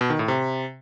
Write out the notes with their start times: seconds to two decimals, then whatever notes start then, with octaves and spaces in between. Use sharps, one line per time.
0.01 B2
0.10 D#3
0.19 A2
0.28 C3